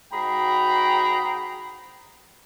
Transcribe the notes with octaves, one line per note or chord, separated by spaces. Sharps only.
G#2 F#4 G#4 G5 A#5 B5